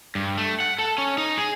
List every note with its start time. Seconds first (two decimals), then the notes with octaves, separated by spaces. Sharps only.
0.15 G2
0.38 A3
0.60 F#5
0.78 A4
0.98 C#4
1.18 D#4
1.37 G#4